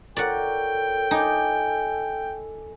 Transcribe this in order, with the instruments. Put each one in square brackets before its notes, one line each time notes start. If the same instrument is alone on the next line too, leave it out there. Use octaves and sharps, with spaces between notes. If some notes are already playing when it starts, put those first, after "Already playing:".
[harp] F4 A#4 C#5 [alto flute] A4 [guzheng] D5 F#5 [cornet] G5
[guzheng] D#4 [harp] G#5 A5 D6